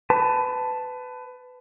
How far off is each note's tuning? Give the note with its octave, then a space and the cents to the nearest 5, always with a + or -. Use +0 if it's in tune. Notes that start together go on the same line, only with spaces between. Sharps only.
B4 +25 A5 +0